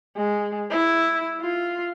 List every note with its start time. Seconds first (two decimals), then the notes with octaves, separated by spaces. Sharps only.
0.17 G#3
0.70 E4
1.41 F4